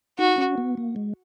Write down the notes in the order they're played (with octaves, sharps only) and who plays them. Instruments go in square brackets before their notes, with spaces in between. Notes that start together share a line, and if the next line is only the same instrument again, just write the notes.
[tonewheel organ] D#4 [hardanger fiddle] F#4
[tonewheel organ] C#4
B3
A#3
G#3